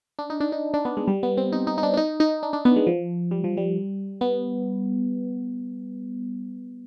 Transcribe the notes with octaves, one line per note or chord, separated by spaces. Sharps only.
D4
D#4
D4
D#4
D4
B3
G#3
G3
B3
C4
D#4
D#4
D#4
D4
D4
D#4
D#4
D4
D4
B3
G#3
F3
G3
F3
G3
B3